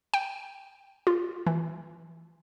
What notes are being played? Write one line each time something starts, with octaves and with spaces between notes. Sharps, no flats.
G5
F4
E3